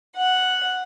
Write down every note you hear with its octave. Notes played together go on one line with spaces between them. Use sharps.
F#5